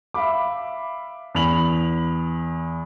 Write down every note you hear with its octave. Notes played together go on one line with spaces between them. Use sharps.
E5 F5 B5 D6
E2 B5 F7 F#7